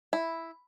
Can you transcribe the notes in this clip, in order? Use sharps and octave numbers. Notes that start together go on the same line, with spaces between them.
E4